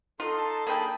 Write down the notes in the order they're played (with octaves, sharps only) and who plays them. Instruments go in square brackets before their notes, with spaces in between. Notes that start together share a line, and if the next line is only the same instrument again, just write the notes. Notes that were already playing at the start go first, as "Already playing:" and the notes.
[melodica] D#4 C6 [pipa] F4 [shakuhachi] A4
[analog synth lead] A5
[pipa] A#3 G#4 G5 [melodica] D4 B5